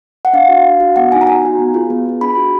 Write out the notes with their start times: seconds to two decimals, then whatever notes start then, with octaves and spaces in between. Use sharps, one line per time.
0.25 F#5
0.33 D4 F5
0.49 F#4
0.65 D4
0.80 F#4
0.96 B3 F#5
1.12 D#4 F#4 G#5
1.21 A#5
1.27 B3 G#5
1.43 D#4 F#4
1.59 B3
1.74 F4 G#4
1.90 B3
2.06 F4 G#4
2.21 D4 B5
2.37 F#4